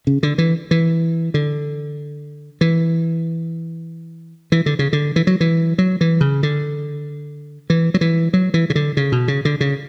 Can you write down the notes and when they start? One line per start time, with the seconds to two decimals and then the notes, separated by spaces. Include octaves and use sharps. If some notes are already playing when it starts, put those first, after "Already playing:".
0.07 C#3
0.23 D3
0.38 E3
0.71 E3
1.34 D3
2.61 E3
4.52 E3
4.66 D3
4.79 C#3
4.93 D3
5.16 E3
5.27 F#3
5.40 E3
5.78 F#3
6.01 E3
6.21 C#3
6.43 D3
7.70 E3
7.94 F#3
8.01 E3
8.33 F#3
8.54 E3
8.70 C#3
8.75 D3
8.97 C#3
9.12 B2
9.28 C#3
9.45 D3
9.61 C#3